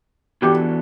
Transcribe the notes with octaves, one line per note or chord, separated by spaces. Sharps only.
E3 B3 D4 F#4 G4 A4